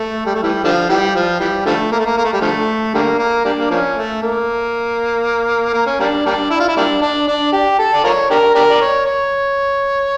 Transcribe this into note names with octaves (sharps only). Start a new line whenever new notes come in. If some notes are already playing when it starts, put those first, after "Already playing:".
Already playing: A3
G3
A3
E3 G3
D3 F3
E3 G3
F3
E3 G3
D3 F3 A3
A#3
A3
A#3
A#3
A3
G3
D3 F3 A3
D3 G3 A#3
A#3
G3 A#3 D4
A#3
F3 A#3 C#4
A3
A#3
A#3
C#4
G3 A#3 D4
G3 A#3 D4
E4
F4
E4
G3 A#3 D4
D4
D4
G4
A4
D5
F4 A#4 C#5
D4 G4 A#4
D4 G4 A#4
D5
C#5
C#5